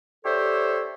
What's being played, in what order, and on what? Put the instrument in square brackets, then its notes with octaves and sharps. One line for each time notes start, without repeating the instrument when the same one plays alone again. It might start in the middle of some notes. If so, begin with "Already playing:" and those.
[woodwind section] D4 G4 A4 C5 C#5 E5